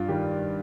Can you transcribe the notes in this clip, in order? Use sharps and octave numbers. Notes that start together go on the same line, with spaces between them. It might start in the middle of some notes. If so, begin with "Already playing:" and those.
Already playing: G2 F4
D#3 G3 G4